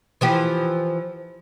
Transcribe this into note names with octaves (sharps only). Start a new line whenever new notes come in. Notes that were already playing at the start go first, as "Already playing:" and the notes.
E3 F3 G4